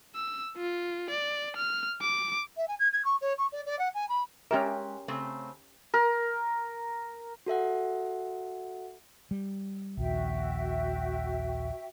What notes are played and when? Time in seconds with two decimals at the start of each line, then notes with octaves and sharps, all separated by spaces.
0.15 E6
0.57 F4
1.10 D5
1.56 F6
2.02 D6
2.56 E5
2.68 G#5
2.79 G#6
2.93 G#6
3.05 C#6
3.21 C#5
3.38 C#6
3.52 D5
3.66 D5
3.79 F#5
3.94 G#5
4.09 B5
4.51 G#3 C#4 G4 A#4 E5
5.08 C#3 A3 C4
5.94 A#4
7.46 F#4 A4 E5 F#5
9.31 G3
9.97 A#1 D#2 F#4 E5 G5